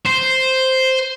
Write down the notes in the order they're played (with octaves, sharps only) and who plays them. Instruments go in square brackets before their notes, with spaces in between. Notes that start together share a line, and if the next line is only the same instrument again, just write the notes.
[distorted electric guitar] C5